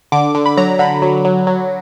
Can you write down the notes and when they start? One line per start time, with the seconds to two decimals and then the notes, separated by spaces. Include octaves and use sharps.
0.12 D3 D6
0.35 D3
0.46 B5
0.57 F#3 A#5
0.79 D3 B5
1.02 F#3
1.25 F#3
1.47 F#3